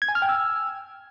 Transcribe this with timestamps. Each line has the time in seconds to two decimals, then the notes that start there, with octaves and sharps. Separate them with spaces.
0.02 G#6
0.09 G#5
0.15 F6
0.22 G5
0.29 E6